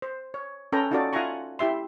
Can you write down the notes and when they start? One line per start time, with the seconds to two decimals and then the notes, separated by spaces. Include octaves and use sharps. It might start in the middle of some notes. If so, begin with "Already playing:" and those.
0.02 C5
0.34 C#5
0.72 C#4 A4 B4 G5 A#5
0.91 C#4 D#4 F4 F#4 A4 D5
1.13 F4 E5 F#5 G#5 A#5 C#6
1.59 E4 G4 E5 C6